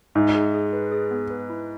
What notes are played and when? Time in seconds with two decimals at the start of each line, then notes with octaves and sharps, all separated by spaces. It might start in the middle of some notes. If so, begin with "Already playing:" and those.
0.15 G#2 E5
0.35 G#4
0.54 G#4
0.73 B4
0.92 G#4
1.11 B3
1.30 B4
1.50 E4